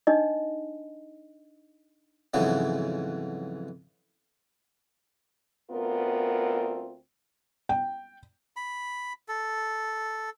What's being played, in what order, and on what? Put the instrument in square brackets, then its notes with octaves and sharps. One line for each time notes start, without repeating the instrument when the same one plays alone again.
[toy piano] D4 D#4 D#5
[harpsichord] F2 G#2 C#3 E3 F#3 B3
[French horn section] D2 B3 C4 F4 A#4
[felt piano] G5
[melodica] B5
A4